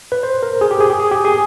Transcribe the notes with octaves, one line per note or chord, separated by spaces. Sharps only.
B4
C5
A#4
G#4
G4
G#4
G4
G#4
G4
G#4